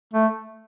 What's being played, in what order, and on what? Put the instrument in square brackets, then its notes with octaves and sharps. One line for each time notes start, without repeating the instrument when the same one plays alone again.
[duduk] A3